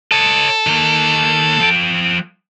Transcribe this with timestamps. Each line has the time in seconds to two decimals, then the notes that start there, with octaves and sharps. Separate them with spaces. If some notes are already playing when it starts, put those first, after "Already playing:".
0.12 A4 C#5 D#5
0.67 D#3 A#3
1.60 F3 G5